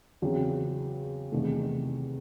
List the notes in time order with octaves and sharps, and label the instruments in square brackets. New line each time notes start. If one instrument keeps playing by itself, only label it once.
[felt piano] E2 C#3 F#3 C4
E2 C3 D#3 A3